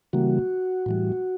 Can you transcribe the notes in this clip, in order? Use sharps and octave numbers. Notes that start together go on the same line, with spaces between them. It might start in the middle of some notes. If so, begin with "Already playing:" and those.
C#3 E3 G3 A#3 F#4
A2 E3 G3